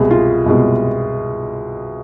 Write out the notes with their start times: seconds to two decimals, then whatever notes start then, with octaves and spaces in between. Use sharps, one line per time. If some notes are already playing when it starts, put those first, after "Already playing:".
Already playing: C2 B2 G#3 G#4
0.11 F4
0.46 C2 B2 G#3